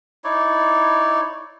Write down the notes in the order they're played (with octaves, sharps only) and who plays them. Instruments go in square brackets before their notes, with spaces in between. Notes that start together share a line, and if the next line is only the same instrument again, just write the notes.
[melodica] D#4 E4 C#5 D5